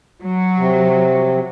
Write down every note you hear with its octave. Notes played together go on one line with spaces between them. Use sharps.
F#3
C3